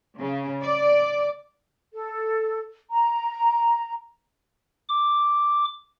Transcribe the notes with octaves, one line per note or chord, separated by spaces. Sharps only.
C#3
D5
A4
A#5
D6